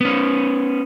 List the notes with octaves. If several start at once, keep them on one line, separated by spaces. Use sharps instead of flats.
B3 C#4